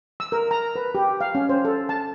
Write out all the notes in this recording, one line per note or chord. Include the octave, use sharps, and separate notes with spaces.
E6
A#4
A#5
B4
G4
F5
C#4
C5
A4
A5